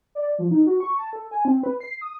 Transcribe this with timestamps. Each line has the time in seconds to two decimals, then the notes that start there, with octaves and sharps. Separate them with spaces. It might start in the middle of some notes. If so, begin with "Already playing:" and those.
0.15 D5
0.39 F3
0.51 D#4
0.66 F#4
0.80 C#6
0.98 A5
1.13 A4
1.31 G#5
1.45 C4
1.63 B4
1.81 C7
2.01 D#6